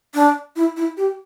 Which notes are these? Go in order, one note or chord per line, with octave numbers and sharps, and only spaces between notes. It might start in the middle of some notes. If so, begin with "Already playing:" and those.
D4
E4
E4
G4